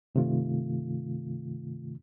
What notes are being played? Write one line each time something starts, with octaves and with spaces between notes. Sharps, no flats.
G2 C3 D#3 A3 F4